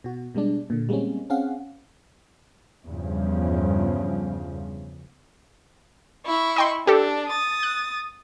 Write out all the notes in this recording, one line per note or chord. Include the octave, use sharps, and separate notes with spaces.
B2 F#4
B2 G3 G#3 D4
A#2 D3
G3 G#3 A#3 C4 C#4
C4 C#4 G#4 F5 F#5
E2 G2 C#3 F3
E4 C#6
D#5 G5 C6
D4 G4 A4
D#6 A6
F#6